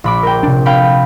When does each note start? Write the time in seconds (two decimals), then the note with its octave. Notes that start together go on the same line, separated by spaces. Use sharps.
0.04 A#1 B5 D6
0.23 A#4 G5
0.43 C3 D4
0.66 F5 G5 B5